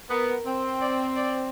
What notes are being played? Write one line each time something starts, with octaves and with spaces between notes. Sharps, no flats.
B3 A#4
C4
D5
D5